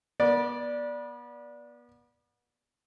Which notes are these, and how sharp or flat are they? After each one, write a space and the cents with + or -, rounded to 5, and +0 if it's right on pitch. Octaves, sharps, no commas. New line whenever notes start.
B3 -35 D5 +0